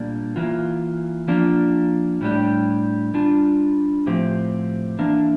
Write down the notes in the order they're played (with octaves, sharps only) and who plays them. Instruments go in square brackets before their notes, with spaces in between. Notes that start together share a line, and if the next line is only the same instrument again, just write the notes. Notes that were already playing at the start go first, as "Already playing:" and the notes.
Already playing: [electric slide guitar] A#2 G3 A#3 D4
E3 A#3 F4
F3 A#3 D4 F4
A2 G3 D4 G4
G3 D4 F4
A2 F3 C4 G4
E3 A#3 D4